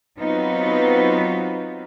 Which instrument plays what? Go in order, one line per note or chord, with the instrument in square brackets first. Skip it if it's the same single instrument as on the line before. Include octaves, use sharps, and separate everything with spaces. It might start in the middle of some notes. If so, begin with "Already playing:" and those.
[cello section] F#3 B3 C4 D#4 F4 B4